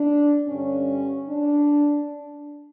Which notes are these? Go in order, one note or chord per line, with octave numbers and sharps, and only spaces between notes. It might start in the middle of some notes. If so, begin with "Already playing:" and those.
Already playing: D4
G2 D3 G3 C#4
D4